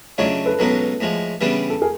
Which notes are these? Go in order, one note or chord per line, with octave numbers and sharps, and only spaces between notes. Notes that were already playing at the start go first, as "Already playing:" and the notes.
C#3 F#3 A3 D4 F4 C#5 D#5
A4 B4
C#2 B2 F#3 B3 D#4 A4 B4
A2 F3 G#3
C#3 E3 G3 B3 D4
A4
G#4 A#4